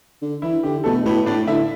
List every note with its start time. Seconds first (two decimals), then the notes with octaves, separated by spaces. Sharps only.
0.22 D3
0.42 E3 E4
0.63 D3 G4
0.84 B2 A3 A4
1.05 A2 B3 B4
1.26 A2 D4 D5
1.47 D3 E4 E5